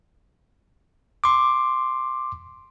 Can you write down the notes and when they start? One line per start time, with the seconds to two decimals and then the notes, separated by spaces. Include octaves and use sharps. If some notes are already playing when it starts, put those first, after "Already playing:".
1.24 C6 D6